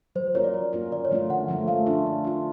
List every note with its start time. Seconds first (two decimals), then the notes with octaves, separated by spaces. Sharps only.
0.15 F#3 C5
0.35 A#3 C#4 F4 A#4 C#5
0.44 D5
0.54 F#3
0.73 A#3 C#4 F4 A#4
0.91 D3 D5
1.05 C#5
1.11 F3 A3 C#4 F4
1.30 D3 F#5
1.48 F3 A3 C#4 F4
1.68 A3 F5
1.87 D4 F4
2.06 A3
2.24 D4 F4